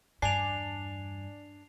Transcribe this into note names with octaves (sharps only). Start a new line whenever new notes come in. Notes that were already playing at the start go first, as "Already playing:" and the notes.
E2 G2 D4 G#5 C7 F7